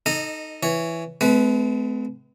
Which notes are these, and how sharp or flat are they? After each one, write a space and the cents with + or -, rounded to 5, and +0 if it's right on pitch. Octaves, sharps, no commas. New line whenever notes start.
D#4 +0 A4 +0 D#5 -25
E3 +10 C#5 +10
A3 -45 C4 -45 B4 +0